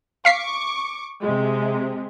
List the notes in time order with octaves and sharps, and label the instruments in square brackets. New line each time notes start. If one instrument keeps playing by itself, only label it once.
[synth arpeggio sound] F5 B6 C7 [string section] C#6 D6
[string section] C3 G#3